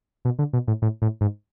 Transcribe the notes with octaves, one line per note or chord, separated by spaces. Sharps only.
B2
D3
B2
A2
A2
A2
G#2